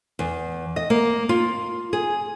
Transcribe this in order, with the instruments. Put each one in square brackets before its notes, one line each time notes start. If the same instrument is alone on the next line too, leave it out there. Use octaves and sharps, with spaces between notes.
[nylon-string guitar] E2
D#5
A#3
F4
G#4